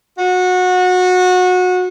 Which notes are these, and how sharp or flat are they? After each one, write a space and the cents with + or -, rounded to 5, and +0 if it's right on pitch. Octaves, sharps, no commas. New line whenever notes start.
F#4 -25